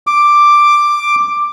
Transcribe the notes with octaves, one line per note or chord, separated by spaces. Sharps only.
D6